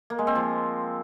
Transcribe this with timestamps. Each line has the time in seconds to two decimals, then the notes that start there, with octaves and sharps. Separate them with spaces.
0.10 A#3
0.19 G#3
0.27 C4
0.35 F3